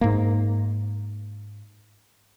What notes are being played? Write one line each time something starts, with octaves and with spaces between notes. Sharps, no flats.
G#2 A#3